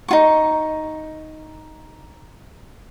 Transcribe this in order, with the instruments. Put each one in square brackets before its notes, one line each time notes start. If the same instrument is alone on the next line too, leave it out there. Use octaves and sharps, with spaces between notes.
[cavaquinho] D#4 F4 C#6